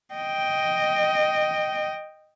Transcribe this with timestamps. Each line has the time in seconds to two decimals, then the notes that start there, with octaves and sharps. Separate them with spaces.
0.14 D#5 G5